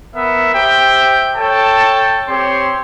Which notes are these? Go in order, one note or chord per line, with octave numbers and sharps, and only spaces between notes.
B3 A#4 E5
G4 C5 E5 G5
A4 C#5 G5 A5
C4 G4 C#5 C6